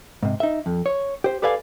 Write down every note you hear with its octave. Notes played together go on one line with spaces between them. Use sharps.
G#2 C3
D#4 E5
F2
C#5
G4 C5
G4 A4 B4 D5 F5 G#5